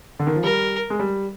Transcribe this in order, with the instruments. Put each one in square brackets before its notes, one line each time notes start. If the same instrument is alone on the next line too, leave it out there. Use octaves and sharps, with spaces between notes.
[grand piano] D3
D#3
F3
[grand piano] G3 [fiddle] A#4
[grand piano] G#3
G3